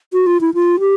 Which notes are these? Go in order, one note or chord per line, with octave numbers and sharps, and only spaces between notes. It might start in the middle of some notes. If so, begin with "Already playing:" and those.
F#4
F4
E4
F4
G4